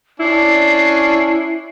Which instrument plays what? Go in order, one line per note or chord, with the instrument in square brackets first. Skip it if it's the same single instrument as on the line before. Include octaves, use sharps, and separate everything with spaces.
[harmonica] C#4 D4 [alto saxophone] E4 [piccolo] C7